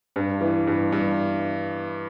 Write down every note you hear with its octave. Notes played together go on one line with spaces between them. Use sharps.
G2
E3
G2
G2